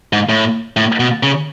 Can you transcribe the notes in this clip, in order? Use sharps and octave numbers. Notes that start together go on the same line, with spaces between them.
G#2
A2
A2
B2
C#3